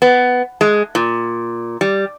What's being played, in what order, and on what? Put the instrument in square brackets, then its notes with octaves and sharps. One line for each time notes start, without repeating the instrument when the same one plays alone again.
[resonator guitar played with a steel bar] B3
G#3
A#2
G3